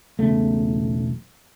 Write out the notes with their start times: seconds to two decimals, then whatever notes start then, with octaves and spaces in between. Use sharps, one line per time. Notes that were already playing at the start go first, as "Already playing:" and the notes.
0.19 E1 B1 C#3 A3